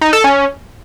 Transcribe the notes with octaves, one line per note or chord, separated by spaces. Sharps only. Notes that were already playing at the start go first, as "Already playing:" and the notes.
D#4
A4
C#4